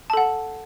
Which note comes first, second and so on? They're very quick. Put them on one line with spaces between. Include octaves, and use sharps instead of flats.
A5 A4 F#5